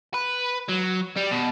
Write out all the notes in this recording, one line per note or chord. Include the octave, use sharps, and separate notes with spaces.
B4
F#3
G3
B2